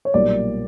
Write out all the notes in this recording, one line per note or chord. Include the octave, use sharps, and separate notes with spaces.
C#5
B1 A#2 G3 A#3 D5